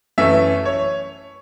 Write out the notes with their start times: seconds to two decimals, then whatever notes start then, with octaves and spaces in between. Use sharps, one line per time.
0.18 F#2 E3 A3 C#4 E5
0.65 C#5